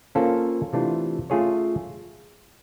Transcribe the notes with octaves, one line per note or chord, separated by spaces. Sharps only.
A#3 C#4 F4 A4 C5
C3 E3 A3 D4 F4
A3 C#4 F4 G#4 C#5